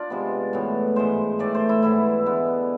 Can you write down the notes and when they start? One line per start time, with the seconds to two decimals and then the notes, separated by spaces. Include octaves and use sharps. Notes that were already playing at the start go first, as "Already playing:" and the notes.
Already playing: D4 F4 D5
0.10 C3 G#3 B3
0.53 A2 E3 B3
0.96 G#2 E3 G#3 C5
1.39 A2 E3 A3 D5
1.55 C5
1.69 E4
1.82 G#2 E3 B3 E4
2.26 D3 G#3 B3